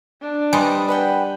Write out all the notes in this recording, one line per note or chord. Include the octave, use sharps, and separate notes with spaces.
D4
G3 B4 C5 D#5 G#5
B4 F#5 G5